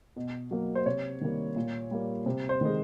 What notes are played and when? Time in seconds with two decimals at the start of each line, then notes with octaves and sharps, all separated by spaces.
0.16 B2
0.51 F#3 A#3
0.75 C5
0.86 C3 C#5
1.21 D#3 G3 A#3
1.56 A#2
1.91 G3 A#3
2.26 C3
2.49 C5
2.61 D#3 G#3